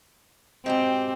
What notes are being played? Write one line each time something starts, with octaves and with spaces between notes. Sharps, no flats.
G#2 B2 C4 G4